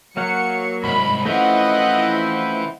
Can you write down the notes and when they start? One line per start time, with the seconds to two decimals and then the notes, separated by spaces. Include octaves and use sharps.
0.17 F#3 A#3 F5 F#5 C#7
0.84 C2 G#2 B5
1.26 E3 F3 A3 C4 C#4 E4 D#5 F#5